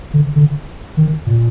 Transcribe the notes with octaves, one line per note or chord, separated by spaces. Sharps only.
D3
D3
D#3
A#2